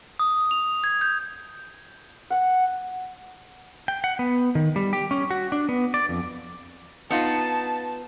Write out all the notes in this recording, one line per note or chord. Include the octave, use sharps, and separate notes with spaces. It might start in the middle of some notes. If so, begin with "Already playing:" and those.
D#6
F7
G#6
G6
F#5
G5
F#5
B3
D#3
G3
G4
C#4
F#4
D4
B3
D5
F2
B3 D#4 F4 A5